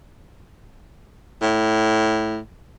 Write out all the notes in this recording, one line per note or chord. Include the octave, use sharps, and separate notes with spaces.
A2